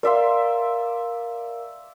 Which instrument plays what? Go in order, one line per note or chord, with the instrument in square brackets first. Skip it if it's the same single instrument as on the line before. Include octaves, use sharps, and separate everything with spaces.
[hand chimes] A#4 F5 [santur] D5 E5 C6